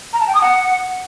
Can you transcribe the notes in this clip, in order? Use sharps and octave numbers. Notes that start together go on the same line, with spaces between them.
A#5
A5
G5
D#6
F#5